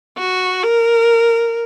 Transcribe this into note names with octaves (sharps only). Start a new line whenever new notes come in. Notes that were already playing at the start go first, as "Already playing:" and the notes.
F#4
A#4